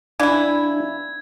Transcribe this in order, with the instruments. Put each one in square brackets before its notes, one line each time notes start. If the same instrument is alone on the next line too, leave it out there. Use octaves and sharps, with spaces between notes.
[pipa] E3 E4 [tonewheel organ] D4 [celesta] D5 F5 [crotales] G#6